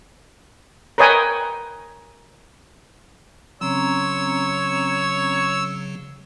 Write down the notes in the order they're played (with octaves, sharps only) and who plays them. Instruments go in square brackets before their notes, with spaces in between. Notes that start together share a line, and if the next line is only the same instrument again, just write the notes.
[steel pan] A#4 B4 C#5 D#5 G5 G#5
[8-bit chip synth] C#3 F#3 [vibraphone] C4 C#4 A#5 [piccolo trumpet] C#5 [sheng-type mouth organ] E6